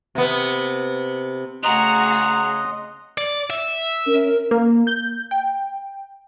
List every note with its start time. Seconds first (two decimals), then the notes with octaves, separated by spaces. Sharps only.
0.15 C3 B3
1.64 C#3 A3 F#4 G#4 D#5 A#5 C6 F#6
3.18 D5
3.50 E5
4.07 C#4 A#4
4.51 A#3
4.87 G6
5.31 G5